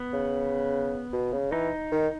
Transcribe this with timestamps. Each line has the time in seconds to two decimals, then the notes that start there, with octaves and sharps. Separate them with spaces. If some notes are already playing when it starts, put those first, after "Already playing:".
Already playing: B3
0.13 C#3
1.13 B2
1.32 C#3
1.52 E3 D#4
1.92 D#3